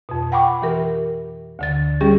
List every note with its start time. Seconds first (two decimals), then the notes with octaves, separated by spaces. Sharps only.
0.09 F2 B2
0.32 F#5 G5 B5 C#6 D6
0.62 E3 G4 A#4
1.59 D2 D3 A6
2.01 G3 C#4 G4 G#4